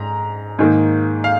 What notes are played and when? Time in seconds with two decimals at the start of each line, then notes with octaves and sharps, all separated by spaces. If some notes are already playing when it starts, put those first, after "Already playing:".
Already playing: G#2 A#5
0.59 G#2 D#3 A#3
1.24 F5